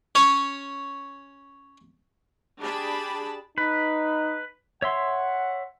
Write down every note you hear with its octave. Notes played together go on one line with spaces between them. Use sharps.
C#4 C#5
D4 G4 G#4 A5 B5
D#4 B4
C#5 E5 F#5 C6